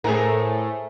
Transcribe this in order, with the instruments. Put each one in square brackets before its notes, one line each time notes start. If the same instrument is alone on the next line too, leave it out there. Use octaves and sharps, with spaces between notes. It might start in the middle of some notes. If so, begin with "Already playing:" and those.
[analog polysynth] A2 A3 [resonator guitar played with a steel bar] G#4 A#4 [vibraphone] C5 C#5 G#5